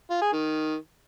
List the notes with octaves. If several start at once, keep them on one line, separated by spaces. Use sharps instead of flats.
F4
G#4
D#3